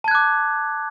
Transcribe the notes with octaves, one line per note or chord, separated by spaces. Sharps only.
A5 D6 F#6 G#6